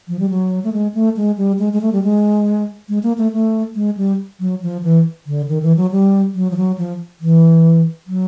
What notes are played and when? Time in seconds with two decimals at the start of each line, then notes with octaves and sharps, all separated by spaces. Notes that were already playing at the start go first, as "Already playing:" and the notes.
0.08 F3
0.19 G3
0.29 F#3
0.64 A3
0.73 G#3
0.94 A3
1.17 G#3
1.37 G3
1.59 G#3
1.73 G#3
1.81 A3
1.93 G3
2.03 G#3
2.89 G#3
3.03 A#3
3.18 A3
3.32 A3
3.75 G#3
3.97 G3
4.40 F#3
4.62 F3
4.83 E3
5.27 D3
5.48 D#3
5.62 E3
5.77 F#3
5.91 G3
6.35 F#3
6.51 F3
6.57 F#3
6.78 F3
7.21 E3
8.07 F#3